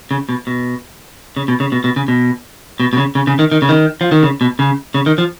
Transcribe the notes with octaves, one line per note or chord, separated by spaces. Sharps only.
C#3
B2
B2
C#3
B2
C#3
B2
B2
C#3
B2
B2
B2
C#3
C#3
C#3
D#3
D#3
C#3
D#3
F3
D#3
C#3
B2
C#3
C#3
D#3
F3